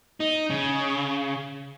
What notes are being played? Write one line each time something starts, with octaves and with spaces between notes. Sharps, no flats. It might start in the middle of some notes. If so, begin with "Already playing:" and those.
D#4
C#3